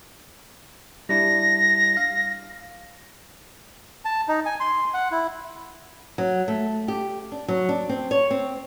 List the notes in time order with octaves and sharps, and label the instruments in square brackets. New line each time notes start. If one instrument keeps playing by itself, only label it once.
[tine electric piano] G3 D4 E4 [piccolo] A#6
[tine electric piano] F5
[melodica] A5
D#4
G#5
C6
F#5
E4
[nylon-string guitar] F#3
A3
G4
D4
F#3
D4
C4
C#5
C4